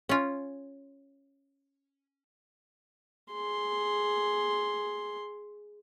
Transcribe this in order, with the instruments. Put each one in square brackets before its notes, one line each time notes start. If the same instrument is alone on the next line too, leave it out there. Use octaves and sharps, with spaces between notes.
[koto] C#4 F4
[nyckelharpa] G#4 C6